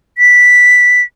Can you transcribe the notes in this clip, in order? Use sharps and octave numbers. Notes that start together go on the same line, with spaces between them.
B6